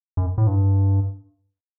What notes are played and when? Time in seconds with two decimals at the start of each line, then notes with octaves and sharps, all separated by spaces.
0.17 F#2
0.38 A2
0.47 G2